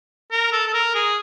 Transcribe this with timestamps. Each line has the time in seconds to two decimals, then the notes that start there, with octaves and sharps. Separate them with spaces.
0.31 A#4
0.52 A4
0.67 A4
0.74 A#4
0.95 G#4